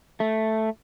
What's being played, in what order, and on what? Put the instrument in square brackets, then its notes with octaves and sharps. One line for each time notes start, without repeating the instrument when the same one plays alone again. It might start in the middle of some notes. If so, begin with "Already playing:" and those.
[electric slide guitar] A3